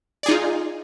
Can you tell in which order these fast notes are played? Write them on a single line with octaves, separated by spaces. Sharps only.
D5 G#4 D#4 F4